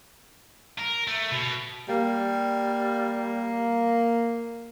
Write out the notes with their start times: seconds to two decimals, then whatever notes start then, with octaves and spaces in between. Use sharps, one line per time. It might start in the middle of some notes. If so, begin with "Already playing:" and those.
0.79 A#4
1.08 A3
1.32 B2
1.89 G3 A#3